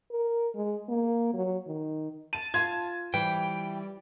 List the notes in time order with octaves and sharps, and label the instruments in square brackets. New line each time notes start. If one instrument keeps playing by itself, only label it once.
[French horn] A#4
G#3
A#3
F#3
D#3
[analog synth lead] A5 [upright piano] D#7
[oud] F4 [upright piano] G#6
[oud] E3 [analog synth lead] G3 [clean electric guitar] G5